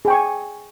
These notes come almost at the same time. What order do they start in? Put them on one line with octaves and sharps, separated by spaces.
G#4 G5 C#6 G#5